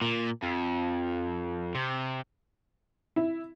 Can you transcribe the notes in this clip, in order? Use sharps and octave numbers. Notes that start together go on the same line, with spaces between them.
A#2
F2
C3
E4